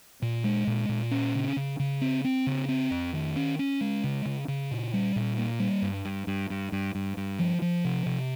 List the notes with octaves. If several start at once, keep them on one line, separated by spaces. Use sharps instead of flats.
A#2
G#3
A#2
A#2
C#4
C#3
C#3
C#3
C4
C4
C#3
C4
F2
D#3
C#4
C#4
G#3
C#3
C#3
C#3
A#2
G3
A#2
A#3
G3
G2
G2
G2
G2
G2
G2
G2
F3
F3
C3
C3